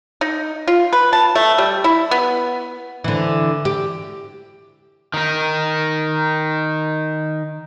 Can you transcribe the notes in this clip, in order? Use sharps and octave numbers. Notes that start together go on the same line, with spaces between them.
D#4
F4
B4
A5
A3
G3
E4
B3
D3 E3
G4
D#3 D#4